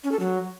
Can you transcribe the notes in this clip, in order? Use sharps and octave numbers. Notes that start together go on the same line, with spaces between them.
C#4
A4
F#3